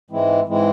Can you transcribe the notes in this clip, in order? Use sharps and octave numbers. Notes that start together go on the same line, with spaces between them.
G#2 E3 G#3 C4 E4
G#2 E3 G#3 C4 E4